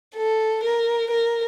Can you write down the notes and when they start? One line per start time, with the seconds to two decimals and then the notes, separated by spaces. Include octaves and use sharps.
0.16 A4
0.64 A#4
1.11 A#4